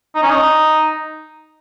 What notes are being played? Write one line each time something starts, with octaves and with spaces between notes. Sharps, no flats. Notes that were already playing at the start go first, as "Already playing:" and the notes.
D#4
C#4
D#4